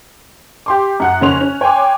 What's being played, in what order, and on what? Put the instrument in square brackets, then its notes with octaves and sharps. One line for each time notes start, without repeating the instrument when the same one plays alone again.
[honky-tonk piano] G4 C6 D6
F#2 F#5 F#6
F1 C#3 A#3 C#4 C6 F7
C#4
C#5 G5 G#5 C6 D6